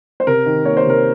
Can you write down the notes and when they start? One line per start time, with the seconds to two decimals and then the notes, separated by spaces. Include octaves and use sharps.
0.20 C5
0.27 C3 A#4
0.46 D#3
0.65 A#3 C#5
0.77 C5
0.85 C3 A#4